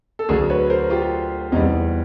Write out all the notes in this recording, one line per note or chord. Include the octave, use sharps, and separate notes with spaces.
A4
D2 D3 F#3 G#4 A#4
B4 C#5
A#4 C5
F4 G4
E2 C3 E3 G3 D#4